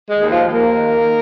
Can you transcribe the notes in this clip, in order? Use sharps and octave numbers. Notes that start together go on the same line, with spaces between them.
G#3 G#4
D#2
F3 F4
D#2
A#3 A#4
D#3